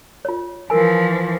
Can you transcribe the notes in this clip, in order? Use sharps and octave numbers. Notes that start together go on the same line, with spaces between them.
F4 C#5
E3 F3 A#4 G#5